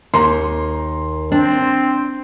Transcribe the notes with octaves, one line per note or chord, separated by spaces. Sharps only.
D#2 A#5 C6
C4 D4